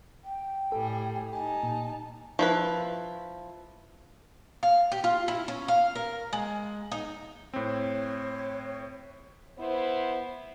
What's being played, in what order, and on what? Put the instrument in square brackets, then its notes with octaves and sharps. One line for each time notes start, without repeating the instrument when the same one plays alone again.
[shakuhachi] G5
[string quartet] A2 G3 G#4 [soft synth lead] A4
[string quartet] D#4 A5 [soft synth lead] G4 [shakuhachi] G#5
[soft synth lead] A#2
[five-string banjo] F3 E4 B4
[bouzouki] F5
G4
F4
E4
C#4
F5
A#4
G#3
D#4
[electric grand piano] A2 C4 [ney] C#5
[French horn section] B3 E4 C5